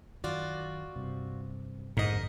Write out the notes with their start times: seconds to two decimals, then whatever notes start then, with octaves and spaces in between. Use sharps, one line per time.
0.24 F#2 D#3 F4 F#4 D5
0.96 G2 C3
1.97 A#1 F2 G#2 D3 A#4 D#5